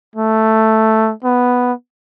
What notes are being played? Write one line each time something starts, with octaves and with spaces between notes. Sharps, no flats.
A3
B3